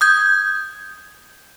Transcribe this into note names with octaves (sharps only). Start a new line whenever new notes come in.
D#6 G6 G#6